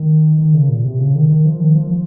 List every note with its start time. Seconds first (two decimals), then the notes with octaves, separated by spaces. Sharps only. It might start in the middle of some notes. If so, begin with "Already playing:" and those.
Already playing: D#3
0.39 D#3
0.54 C#3
0.69 A#2
0.84 C3
0.99 C#3
1.15 D#3
1.30 D#3
1.45 F3
1.60 D#3
1.75 F3
1.91 F3